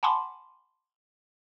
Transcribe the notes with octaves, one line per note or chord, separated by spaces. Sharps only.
F#5 G#5 A5 B5 C6 D6